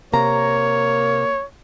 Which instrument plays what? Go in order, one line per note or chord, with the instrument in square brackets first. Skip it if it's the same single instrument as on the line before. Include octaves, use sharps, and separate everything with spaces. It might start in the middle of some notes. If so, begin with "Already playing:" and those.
[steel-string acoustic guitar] C3 A#5 [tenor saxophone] A#3 [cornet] C#5